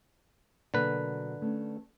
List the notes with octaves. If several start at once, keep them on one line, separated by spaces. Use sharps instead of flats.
B2 D3 F#3 A#3 B4
A3 B3 C#4